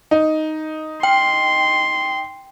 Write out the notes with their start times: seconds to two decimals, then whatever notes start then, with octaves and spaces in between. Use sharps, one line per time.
0.11 D#4
1.03 G5 C6